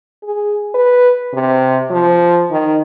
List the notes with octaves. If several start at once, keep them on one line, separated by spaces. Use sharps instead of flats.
G#4
B4
C3
F3
D#3